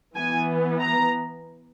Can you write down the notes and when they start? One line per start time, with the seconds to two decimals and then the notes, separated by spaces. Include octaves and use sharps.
0.16 E3 B3 G#5
0.81 A#5